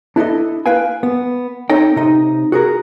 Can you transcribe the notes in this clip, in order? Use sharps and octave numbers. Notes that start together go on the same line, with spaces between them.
D4 E4 A4 D#5
B4 F5 G5 G#5
B3
C4 D#4 A4 C#5 D#5 G5
C3 D#4 D#5
F#4 G#4 A#4